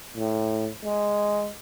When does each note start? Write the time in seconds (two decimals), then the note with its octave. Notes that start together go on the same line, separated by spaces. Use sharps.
0.17 A2
0.84 G#3